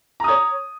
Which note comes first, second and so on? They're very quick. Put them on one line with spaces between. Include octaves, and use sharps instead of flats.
A#5 D#6 C#5